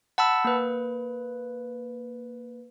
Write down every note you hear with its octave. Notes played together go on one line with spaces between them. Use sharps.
F#5 A5 B5 E6
A#3 B4